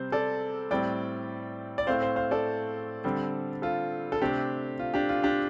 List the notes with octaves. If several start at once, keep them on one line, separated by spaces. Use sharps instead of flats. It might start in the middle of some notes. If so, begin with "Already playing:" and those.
Already playing: C3 G3 C4 C5
A4 D5
A2 G3 C4 D5 G5
D5
A2 A3 C4 C5 F5
C5 F5
C5 F5
A4 D5
D3 G3 C4
F4 A4
A4
C3 A3 C4 D4 G4
F4
D4 G4
F4
D4 G4